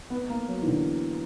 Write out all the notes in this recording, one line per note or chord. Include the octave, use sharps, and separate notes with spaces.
B3
A#3
F#3
E3
D3